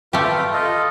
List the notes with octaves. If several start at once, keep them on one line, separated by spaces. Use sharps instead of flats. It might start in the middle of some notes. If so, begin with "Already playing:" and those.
A3 F4 G4 B4
F4 A4 D#5